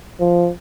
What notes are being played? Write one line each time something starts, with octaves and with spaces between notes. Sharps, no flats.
F3